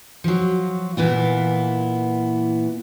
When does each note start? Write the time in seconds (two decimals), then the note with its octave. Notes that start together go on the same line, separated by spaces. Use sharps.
0.24 F3 F#3
0.97 A#2 E3 B3 E4